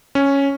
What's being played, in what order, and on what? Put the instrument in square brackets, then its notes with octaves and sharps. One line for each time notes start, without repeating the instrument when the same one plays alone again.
[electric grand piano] C#4